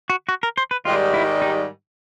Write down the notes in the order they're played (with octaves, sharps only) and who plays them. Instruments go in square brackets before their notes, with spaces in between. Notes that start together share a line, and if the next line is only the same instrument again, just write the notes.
[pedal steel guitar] F#4
F#4
A#4
C5
B4
[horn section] G#2 D#3 G3 [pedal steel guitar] F4
[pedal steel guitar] E4
D#4